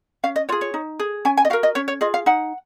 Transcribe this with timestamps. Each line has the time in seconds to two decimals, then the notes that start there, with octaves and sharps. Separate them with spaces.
0.24 C#4 F5
0.36 D#5
0.49 F4 G#4 C#5
0.61 C#5
0.74 D#4
1.00 G#4
1.25 C#4 G#5
1.37 G#5
1.45 D#5
1.50 F#4 A#4 F5
1.63 D#5
1.75 C#4 C#5
1.88 C#5
2.01 F4 G#4 D#5
2.14 F5
2.26 D#4 F#5